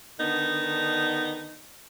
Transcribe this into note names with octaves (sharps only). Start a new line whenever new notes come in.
D3 D#3 B3 D4 D#4